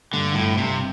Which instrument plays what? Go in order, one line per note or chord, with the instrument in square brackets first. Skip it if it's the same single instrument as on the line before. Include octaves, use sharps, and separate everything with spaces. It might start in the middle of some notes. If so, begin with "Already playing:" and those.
[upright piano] G2 [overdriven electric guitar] D3
[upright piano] G1 [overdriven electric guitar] A2
[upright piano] G2 [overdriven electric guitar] C3